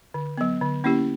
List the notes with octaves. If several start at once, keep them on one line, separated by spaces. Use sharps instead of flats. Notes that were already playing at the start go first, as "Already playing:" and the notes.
D3
F#3 B3
D3
A#3 C#4 E4 G4